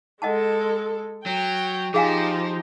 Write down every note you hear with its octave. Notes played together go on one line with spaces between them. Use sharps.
G#3 A4 D#5 F#5 A5
F#3 G5
F3 D#4 G4 G#4 F5 G#5